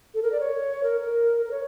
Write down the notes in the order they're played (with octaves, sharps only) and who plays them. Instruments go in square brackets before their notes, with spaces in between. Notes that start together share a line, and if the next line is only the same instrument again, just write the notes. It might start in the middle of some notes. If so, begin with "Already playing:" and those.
[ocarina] A4
A#4
D5
C#5
A#4
A#4
A#4
C#5